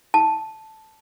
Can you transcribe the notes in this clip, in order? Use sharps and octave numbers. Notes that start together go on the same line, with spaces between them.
A5